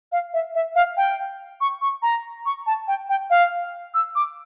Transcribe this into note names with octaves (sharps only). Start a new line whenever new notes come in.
F5
E5
E5
F5
G5
C#6
C#6
A#5
C#6
A5
G5
G5
F5
E6
D6